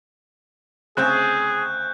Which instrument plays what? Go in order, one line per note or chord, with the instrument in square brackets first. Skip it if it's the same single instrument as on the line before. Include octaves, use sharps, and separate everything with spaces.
[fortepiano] D2 C#3 C4 [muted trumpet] G#4 [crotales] F#6 G6